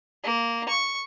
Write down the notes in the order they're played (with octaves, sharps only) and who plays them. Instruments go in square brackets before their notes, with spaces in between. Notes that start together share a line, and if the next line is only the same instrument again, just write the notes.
[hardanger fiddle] A#3
C#6